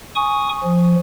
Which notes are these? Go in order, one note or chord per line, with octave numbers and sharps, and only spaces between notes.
G#5 C#6 D#6
F3